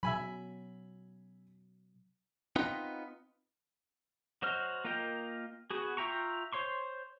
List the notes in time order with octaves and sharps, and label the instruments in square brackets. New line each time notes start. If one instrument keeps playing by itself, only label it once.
[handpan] B2 F#3 [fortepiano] E5 G#5 B5
[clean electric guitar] B3 C4 D#4 F4 B4
[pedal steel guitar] F#3 F#4 C5 D#5 F6
A#3 F4 A#4 D#5 G5
B3 F#4 G#4
F4 E5 G5 A#5 C#6
C5 C#5 C6 C#6